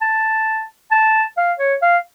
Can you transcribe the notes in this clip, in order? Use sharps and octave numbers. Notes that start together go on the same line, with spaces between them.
A5
A5
F5
C#5
F5